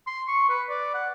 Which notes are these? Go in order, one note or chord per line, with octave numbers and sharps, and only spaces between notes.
C6
C#6
B4
D5
F#5